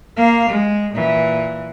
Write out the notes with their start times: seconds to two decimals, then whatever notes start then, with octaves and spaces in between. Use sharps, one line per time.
0.16 A#3 F5
0.50 G#3
0.94 A#2 E3